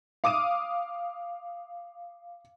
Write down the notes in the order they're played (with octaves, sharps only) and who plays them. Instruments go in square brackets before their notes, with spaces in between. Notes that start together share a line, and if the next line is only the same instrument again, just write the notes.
[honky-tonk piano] F5 D6 D#6 D#7